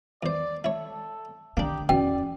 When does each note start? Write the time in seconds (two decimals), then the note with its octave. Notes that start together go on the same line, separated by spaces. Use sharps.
0.23 E2 C5 D5
0.64 E4 A4 C#5
1.57 D3 A#3 D4 D#4 G4
1.89 E2 B2 C#4 D5 G5